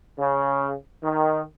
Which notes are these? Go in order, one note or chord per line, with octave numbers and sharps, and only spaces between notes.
C#3
D#3